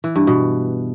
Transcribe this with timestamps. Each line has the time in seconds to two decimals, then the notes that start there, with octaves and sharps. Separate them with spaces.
0.04 E3
0.16 G2
0.27 B2